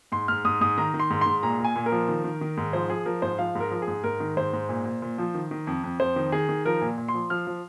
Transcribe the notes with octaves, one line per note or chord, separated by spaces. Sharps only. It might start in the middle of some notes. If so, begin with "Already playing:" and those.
G#2 C6
G#2 F6
G#2 D#6
G#2 D#6
D#3 A#5
D#3
C6
G#2
G#2 C6
A#2 A#5
A#2
G#5
A#2
A#4
F3
D#3
D#3
D#3
G#2
F3 C5
F3 G#4
F3 A#4
G#2 C5
F3 F5
G#2 A#4
F3
G#4
G#2
G#2 A#4
D#3
G#2 C5
G#2
A#2
A#2
A#2
F3
D#3
D#3
F2
F2
F2 C5
D#3
D#3 G#4
D#3
F3 A#4
A#2
A#2
C6
F3
F3 F6
F3